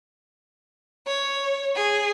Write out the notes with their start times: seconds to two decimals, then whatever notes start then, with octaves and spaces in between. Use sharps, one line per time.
1.07 C#5
1.75 G#4